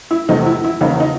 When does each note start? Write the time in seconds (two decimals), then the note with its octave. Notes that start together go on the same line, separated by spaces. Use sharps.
0.11 E4
0.28 E2 C3 F3 A3 D#4
0.46 E4
0.64 E4
0.81 E2 C#3 F3 A#3 D#4 F4
1.00 D#4